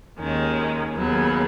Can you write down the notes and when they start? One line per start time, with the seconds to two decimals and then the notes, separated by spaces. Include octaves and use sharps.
0.19 D#2 D#3 G#3 C#4
0.95 D#2 C#3 F#3 B3